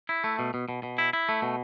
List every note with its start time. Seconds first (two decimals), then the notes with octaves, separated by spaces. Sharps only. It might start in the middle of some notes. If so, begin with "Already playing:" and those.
0.09 E4
0.24 A3
0.39 B2
0.54 B2
0.69 B2
0.83 B2
0.98 E4
1.13 E4
1.29 A3
1.42 B2